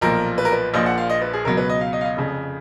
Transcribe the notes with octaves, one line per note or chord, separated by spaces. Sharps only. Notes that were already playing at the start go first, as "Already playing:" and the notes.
B1 A#2 F3 A#4
B4
A#4
B4
A#1 A#2 F3 D#5
F#5
F5
D#5
B4
G#4
C#2 B2 F#3 A#4
B4
D#5
F5
D#5
F5
D#5
F1 F2 C#3